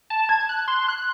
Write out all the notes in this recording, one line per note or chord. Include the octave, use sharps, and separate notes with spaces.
A5
G#6
F#6
C6
F#6